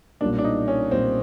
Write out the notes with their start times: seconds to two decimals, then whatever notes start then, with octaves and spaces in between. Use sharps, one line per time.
0.21 B1 A#2 G3 A#3 C#4 D4
0.39 D4
0.44 D#4
0.68 C#4
0.91 B1 A#2 G3 A#3 C4 C#4